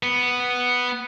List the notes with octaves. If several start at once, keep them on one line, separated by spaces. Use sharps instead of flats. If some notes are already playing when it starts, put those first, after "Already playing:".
B3